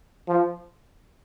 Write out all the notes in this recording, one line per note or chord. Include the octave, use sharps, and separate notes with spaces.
F3